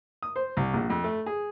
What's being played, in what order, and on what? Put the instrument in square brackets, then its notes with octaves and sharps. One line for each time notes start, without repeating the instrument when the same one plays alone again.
[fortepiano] D#6
C5
C2
A#1
F2
A3
G#4